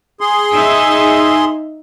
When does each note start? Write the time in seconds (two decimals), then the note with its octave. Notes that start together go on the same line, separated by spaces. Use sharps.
0.21 G#4 C6
0.53 D#4 E5